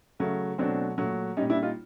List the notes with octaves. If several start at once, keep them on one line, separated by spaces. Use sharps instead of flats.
C#3 F#3 A3
B2 F#3 A3 C4 D4
A#2 F#3 A3
A#2 G3 C#4 D#4
D4 E4
D#4 F4